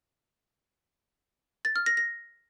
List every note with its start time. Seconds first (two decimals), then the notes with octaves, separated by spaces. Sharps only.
1.65 A6
1.76 F6
1.86 A#6
1.97 A#6